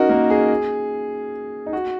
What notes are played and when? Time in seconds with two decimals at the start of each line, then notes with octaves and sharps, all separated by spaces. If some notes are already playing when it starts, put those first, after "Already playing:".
Already playing: C#4 D#4 F#4 A#4
0.09 A#3
0.30 G#4
1.66 D#4
1.73 F#4